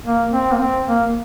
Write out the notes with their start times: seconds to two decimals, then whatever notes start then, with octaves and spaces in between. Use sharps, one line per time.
0.06 A#3
0.33 C4
0.52 A#3
0.59 C4
0.86 A#3